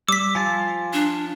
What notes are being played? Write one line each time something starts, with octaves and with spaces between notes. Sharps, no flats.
G3 D6 E6 B6
F3 F4 G#5 A5
D4